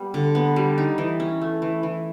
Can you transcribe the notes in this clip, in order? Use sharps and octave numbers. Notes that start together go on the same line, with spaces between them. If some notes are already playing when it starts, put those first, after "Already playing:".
Already playing: G3 B3
D3
B3
G3
D#4
E3
C#4
A3
E3
E3